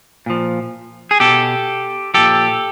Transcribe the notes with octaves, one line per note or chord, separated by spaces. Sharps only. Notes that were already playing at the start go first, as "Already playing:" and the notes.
A#2 F3
G#4
B2 G4 A4
A#2 F3 G4 A4